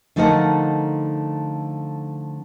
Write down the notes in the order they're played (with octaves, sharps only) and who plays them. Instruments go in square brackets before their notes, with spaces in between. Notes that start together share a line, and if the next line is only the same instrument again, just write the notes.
[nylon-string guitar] D3 F3 A3 D#4 A#4 F#5